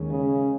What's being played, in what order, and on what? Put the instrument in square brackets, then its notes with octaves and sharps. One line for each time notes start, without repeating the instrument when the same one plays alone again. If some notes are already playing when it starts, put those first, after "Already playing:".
Already playing: [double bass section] D#2 D#3 G#3 C#4
[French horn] C#3